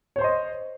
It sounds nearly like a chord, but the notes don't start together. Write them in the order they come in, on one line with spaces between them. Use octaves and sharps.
C#5 C5 C6 D#5